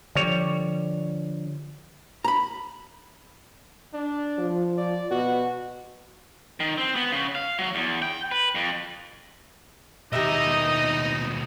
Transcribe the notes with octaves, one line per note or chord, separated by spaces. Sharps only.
D3 F3 G3 C#5
A#5 B5
D4
F3
D5
B2 F#4
D#3
C4
B3
C#3
F5
F#3
E2
G5
B4
F2
D#2 B2 D#4 G4 A#4 D#5 E5